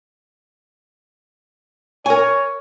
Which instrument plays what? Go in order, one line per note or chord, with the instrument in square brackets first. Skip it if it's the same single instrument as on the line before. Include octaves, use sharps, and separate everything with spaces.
[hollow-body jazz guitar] A#4 G#5 [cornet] C#5